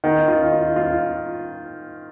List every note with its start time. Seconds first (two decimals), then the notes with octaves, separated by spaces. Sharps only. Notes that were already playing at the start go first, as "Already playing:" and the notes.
0.04 D#3
0.28 F4
0.52 F4
0.76 F4